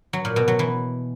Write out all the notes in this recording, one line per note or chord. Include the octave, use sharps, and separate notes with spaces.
F#3
A#2
B2
F#3
E3